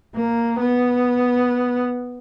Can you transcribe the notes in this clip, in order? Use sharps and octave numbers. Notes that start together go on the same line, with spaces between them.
A#3
B3